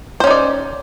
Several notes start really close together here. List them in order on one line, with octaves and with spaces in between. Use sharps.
C5 C#4 D#4 D5